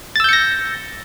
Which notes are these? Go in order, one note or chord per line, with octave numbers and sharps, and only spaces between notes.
E6 G6 A6 A#6 C#7